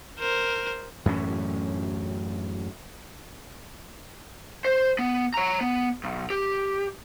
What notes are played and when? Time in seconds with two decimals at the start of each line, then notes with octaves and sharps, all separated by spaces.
0.19 A#4 C5
1.06 F#2 A2 E3 C#4
4.65 C5
4.99 B3
5.34 C#5 A#5
5.61 B3
6.04 B1
6.30 G4